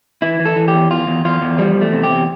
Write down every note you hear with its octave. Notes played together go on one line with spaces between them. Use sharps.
E3 E4
E3
A4
E3
G4
E2
E2 F4
E2
E2 F4
E2
F3 G3
E2
A3
C3
G4
E2